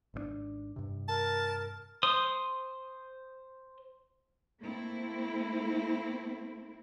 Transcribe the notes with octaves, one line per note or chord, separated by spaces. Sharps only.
G#1 D3 D4
G2 C3
A#4 A5
C5 D#6
A3 A#3 C4 E4